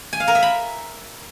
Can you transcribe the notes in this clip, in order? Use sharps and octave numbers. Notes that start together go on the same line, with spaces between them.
G#5
F5
A#4
E5
B5